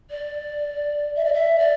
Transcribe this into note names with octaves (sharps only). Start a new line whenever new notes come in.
D5
E5
D5
E5
D5